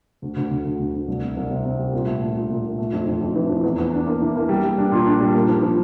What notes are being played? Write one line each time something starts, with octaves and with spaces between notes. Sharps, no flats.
D2
D2
D2
D2
D2
D2
C2
C3
C2
C3
C3
G3
A#2
A3
A#2
A#2
A#2
A#2
A3
F2
F2
F2
E3
F2
E2
E2
D4
A#3
E3
A#3
G3
G3
D4
A#2
D4
G3
A#3
F3
F3